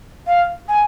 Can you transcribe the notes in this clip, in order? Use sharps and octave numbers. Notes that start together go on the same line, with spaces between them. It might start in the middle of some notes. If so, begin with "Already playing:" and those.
F5
G#5